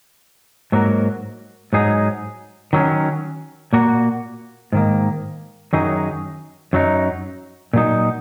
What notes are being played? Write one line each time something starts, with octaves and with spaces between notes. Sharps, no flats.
G#2 F#3 A#3 F#4 A#4
G#2 F#3 D#4 G#4
D#3 F#3 C#4
A#2 A#3 F#4
G#2 D#3 A#3
F#2 D#3 F#3 D#4 G#4
F#2 F#3 D#4
A#2 F#3 D#4